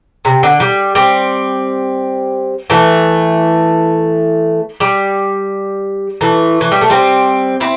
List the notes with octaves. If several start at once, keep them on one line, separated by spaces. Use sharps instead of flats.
C3
D3
G3
G3 C4
E3 A3
G3
E3 A3
E3
G3
A3
G3 C4
C4 E4